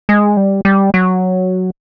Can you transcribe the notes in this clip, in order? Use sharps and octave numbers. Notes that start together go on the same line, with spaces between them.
G#3
G3
G3
F#3